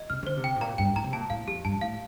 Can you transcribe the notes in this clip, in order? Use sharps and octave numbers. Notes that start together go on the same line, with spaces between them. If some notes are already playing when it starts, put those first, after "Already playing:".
Already playing: D#5
C3 F6
D3 C5
C3
G5
A2
A#2 A#5
G2 G5
A2 A#5
C3
A#2 A5
A2 F5
F2 G4
G2 A5
A2 F5